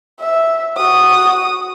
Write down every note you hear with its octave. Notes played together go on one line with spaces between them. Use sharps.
E5
F#4 D#6